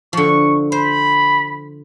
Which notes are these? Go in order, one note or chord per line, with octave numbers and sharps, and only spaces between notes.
D3 F3 C#6
C5 B5